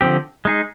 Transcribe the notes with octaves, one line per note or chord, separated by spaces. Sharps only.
D3 F3 C4 G4
G#3 D#4 G#4